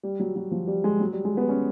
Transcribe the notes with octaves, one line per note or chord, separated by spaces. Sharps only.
G3
F#3
F#3
F3
G3
G#3
F#3
G3
G#3
B3
C#4